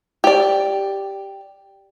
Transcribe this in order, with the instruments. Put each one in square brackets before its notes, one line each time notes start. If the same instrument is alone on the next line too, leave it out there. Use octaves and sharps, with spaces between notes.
[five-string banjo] G4 D5